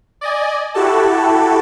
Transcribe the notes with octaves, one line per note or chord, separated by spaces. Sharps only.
D5 D#5 G#5
E4 F#4 G4 A4 A5